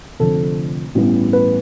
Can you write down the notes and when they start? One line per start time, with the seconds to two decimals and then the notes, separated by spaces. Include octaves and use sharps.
0.20 F1 F2 D3 A4
0.95 A1 G2 E3 B3
1.33 B4